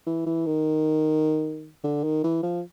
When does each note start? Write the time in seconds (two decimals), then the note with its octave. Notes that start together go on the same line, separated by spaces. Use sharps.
0.07 E3
0.26 E3
0.46 D#3
1.84 D3
2.03 D#3
2.24 E3
2.43 F3